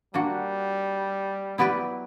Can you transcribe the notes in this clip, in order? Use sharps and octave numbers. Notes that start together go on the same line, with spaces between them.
G3 A#3 D4 F#4
F#3 B3 E4 G4 B4 D5